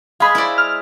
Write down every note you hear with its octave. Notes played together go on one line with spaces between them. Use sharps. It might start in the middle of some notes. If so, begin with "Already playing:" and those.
G#3 G#4 F5 B5
E4 C5 D5
F6